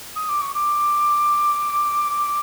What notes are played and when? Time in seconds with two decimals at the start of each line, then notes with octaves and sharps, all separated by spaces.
0.16 D#6
0.29 D6
0.41 C#6
0.55 D6